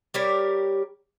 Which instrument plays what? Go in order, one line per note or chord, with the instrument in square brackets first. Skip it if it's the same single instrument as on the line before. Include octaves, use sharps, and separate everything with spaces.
[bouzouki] G3 G4 A#4 C#5